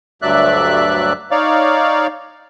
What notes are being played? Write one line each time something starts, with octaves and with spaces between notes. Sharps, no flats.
D2 G2 F#3 D5 E5 F#6
D#4 C#5 D5 F5